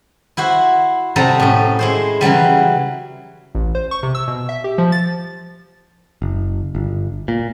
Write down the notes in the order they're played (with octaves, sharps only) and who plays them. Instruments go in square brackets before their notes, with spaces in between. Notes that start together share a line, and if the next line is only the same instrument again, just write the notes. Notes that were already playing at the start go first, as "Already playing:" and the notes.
[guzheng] E4 F#4 C5
C3 F#3 G3 D#4 A4 A#5
A2 C#4
G#3 E4 C5
C#3 E3 F#3 G3
[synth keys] A1
C5
C#6
C3
E6
B2
E5
G4
F3
A6
[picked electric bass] F#1
G1
A#2